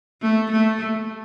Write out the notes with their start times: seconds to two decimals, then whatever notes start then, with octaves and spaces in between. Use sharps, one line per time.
0.22 A3
0.51 A3